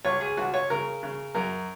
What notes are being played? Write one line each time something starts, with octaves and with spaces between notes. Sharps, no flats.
C#2 C#5
G#4
C#2 F#4
C#5
C#3 A#4
C#3
F#2 A#4